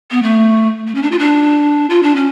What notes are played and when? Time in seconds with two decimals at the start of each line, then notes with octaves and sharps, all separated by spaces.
0.11 B3
0.23 A3
0.87 A3
0.95 C#4
1.03 D4
1.12 F4
1.19 D4
1.90 F4
2.03 D4
2.16 C#4